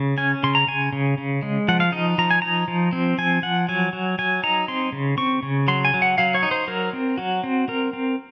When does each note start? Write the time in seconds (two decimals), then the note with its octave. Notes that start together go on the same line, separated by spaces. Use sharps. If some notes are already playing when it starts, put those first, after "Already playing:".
Already playing: C#3
0.18 C#4 G#5
0.43 C#3 C6
0.55 A#5
0.67 C#3 G#5
0.93 C#3
1.18 C#3
1.42 G#3
1.68 F3 F#5
1.80 F5
1.92 D#4 D#5
2.18 F3 A#5
2.31 G#5
2.42 D#4 A#5
2.68 F3
2.93 C4
3.18 F3 G#5
3.42 F3 F#5
3.69 F#3 G#5
3.93 F#3
4.19 F#3 G#5
4.43 D#4 A#5
4.68 C4 C6
4.93 C#3
5.18 C4 C#6
5.43 C#3
5.68 F#3 C6
5.85 G#5
5.94 F#3
6.02 F#5
6.18 F#3 F5
6.35 C#5
6.43 D#4
6.51 C5
6.67 F#3 A#4
6.93 C4
7.18 F#3 F#4
7.44 C4
7.68 C4 A#4
7.93 C4